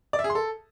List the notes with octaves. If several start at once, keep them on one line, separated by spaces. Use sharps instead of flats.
D5
E5
G#4
C6
A4